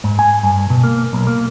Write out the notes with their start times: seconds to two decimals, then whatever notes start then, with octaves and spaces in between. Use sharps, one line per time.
0.04 G#2
0.19 G#5
0.43 G2
0.70 B2
0.83 A#3
1.13 B1
1.27 A#3